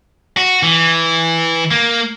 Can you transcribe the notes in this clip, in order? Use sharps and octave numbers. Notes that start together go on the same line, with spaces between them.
F#4
E3
A#3